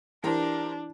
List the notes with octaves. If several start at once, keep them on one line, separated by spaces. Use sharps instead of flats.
E3 D4 G4 A#4 C5